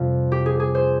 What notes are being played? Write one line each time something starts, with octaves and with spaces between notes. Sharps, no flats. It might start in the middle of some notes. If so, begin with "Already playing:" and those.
Already playing: F2 C3 G3 F4
G4
G#4
G#4
C5